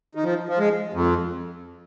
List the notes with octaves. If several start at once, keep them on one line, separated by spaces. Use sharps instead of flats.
D#3
F3
F3
G#3
F2